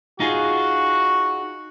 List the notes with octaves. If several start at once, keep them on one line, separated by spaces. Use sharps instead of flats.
D#4 F4 F#4 G#4